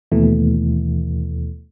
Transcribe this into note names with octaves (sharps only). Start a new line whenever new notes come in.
D#2 B2 E3 A3